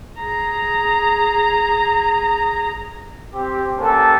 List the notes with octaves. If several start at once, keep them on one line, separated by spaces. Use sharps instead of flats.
G#4 A#5
C4 G4
A#3 C#4 G4 A4 B4 C5